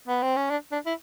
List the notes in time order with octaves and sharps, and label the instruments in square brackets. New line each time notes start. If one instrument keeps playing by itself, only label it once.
[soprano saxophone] B3
C4
C#4
D4
D4
E4